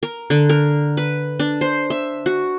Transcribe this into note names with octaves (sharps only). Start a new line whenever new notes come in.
A#4
D3
A#4
B4
D4
C5
E5
F#4